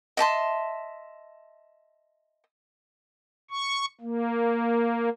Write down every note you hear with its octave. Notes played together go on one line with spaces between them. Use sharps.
D#5 E5 A5 C6
C#6
A#3